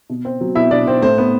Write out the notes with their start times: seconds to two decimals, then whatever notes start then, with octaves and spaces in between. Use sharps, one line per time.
0.10 B2
0.25 C4
0.41 F#3
0.55 B2 E4 E5
0.71 B2 D4 D5
0.87 C4 C5
1.02 A2 C5
1.18 B3